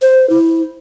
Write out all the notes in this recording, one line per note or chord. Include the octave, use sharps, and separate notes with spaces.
C5
E4